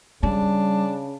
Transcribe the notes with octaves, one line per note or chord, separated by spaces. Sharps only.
C#3 G3 D4